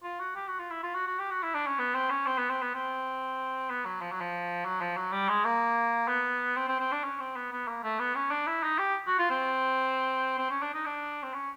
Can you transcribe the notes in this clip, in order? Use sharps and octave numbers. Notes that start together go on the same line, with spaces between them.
F4
F#4
G4
F#4
F4
E4
F4
F#4
F#4
G4
F#4
E4
D4
C#4
B3
C4
C#4
C4
B3
C4
B3
C4
B3
F#3
F3
F#3
F3
F#3
F3
F#3
G3
G#3
A#3
B3
C4
C4
C4
D4
C#4
C4
B3
B3
A#3
A3
B3
C#4
D4
E4
D#4
G4
F#4
F4
C4
C4
C#4
D4
D#4
D4
C4
C#4